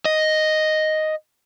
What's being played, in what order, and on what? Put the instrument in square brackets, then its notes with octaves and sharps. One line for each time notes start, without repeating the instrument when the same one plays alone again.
[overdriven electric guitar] D#5